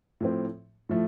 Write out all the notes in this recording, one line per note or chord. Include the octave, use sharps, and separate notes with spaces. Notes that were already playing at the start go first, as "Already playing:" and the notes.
A2 F3 C4
A2 F3 A3